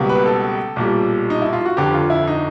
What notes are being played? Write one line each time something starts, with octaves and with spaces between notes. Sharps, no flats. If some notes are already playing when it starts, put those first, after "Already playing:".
Already playing: C#2 B2 G3 A#3
B4
A4
B1 A#2 G3
D#4
E4
F4
F#4
G1 F2 D3 G4
F4
E4
D#4